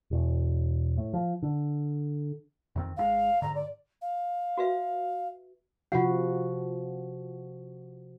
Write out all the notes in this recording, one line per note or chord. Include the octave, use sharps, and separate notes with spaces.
E1
A2
F3
D3
F2 D#3 C4
G#1 D3 G#3 F5
G#2 D3 A#5
D5
F5
F#4 B4 E5
C3 F3 F4 F#4 F#5